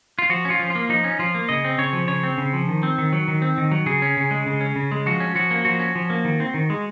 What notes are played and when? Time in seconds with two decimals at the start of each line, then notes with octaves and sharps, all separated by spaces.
0.19 F4
0.30 F3 F#4
0.45 C#4
0.50 F4
0.59 F3
0.70 F4
0.75 A#3
0.89 F3 D#4
1.04 C#4
1.19 F3 F4
1.35 A#3
1.49 C#3 D#5
1.64 C4
1.78 C#3 C#5
1.93 F3
2.08 C#3 C#5
2.23 C4
2.38 C#3
2.53 F3
2.68 D#3
2.83 C4
2.98 D#3
3.13 F#3
3.28 D#3
3.42 C4
3.58 D#3
3.71 F#3
3.86 C#3 G#4
4.02 C#4
4.17 C#3
4.31 G#3
4.46 C#3
4.61 C#4
4.76 C#3
4.92 G#3
5.06 F3 F#4
5.20 C#4
5.35 F3 F#4
5.51 A#3
5.65 F3 F#4
5.79 C#4
5.95 F3
6.10 A#3
6.25 D#3
6.40 C4
6.54 D#3
6.70 G#3